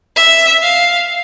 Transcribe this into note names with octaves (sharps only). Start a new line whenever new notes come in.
E5
F5